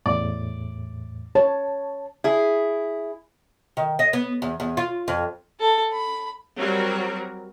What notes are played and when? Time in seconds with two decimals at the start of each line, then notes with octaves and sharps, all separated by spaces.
0.06 E2 A2 D5
1.35 C#5 A5
2.24 E4 G#4
3.77 D#3
3.99 D#5
4.13 B3
4.42 E2
4.60 E2
4.77 F4
5.08 F2
5.60 A4
5.92 B5
6.59 F#3 G3 C4 F#4 A#4